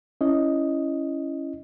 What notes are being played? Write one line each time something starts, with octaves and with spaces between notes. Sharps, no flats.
C#4 E4 D#5